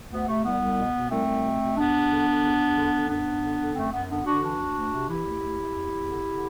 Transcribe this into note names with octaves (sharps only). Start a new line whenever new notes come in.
D2 B3
C3 A3
C2 B3
C2
B2
B2
C2 A3 C4
C2
B2
B2
E2 B3 D4
E2
D3
D3
E2
E2
D3
D3
F#2 B3 D4
F#2
D3
D3
F#2 A3 C4
F#2 B3
D3 B3 D4
D3 D4 F#4
E3 D4 F#4
D2
D2
C3
E3 E4 G4
D2
D2
C3
E2
E2
D3
D3